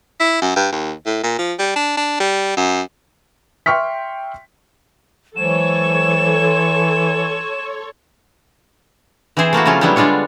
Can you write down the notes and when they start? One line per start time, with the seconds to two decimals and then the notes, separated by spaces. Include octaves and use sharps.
0.20 E4
0.42 F#2
0.56 G2
0.72 D#2
1.06 A2
1.23 A#2
1.38 F3
1.59 G3
1.76 D4
1.97 D4
2.20 G3
2.57 F#2
3.66 E5 G5 C6 C#6 F6 B6
5.36 E3 F#3 G#3 A4 C5 C#5 E7
6.44 C6
9.37 E3 C4 E4 G#4 C5
9.53 A3 A#3 E4 F#4
9.65 C#3 F3 F#3 C#4 F4
9.81 F#3 G3 B3 D4 E4 G4
9.96 D3 G3 G#3 D4 F4 C#5